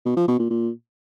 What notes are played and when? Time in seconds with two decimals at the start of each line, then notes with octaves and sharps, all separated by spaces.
0.05 B2
0.17 F3
0.28 B2
0.39 A#2
0.50 A#2